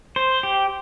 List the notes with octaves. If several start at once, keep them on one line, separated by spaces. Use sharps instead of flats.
C5
G4